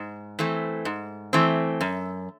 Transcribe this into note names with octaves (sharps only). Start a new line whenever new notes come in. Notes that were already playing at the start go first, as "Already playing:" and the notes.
Already playing: G#2
E3 A3 C4
G#2
E3 A3 C4
F#2